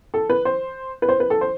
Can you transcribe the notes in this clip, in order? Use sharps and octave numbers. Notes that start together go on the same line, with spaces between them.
A4
B4
C5
B4
C5
B4
A4
C5